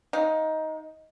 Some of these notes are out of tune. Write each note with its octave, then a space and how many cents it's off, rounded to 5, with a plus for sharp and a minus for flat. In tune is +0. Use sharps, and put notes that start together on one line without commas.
D#4 +15 F5 +40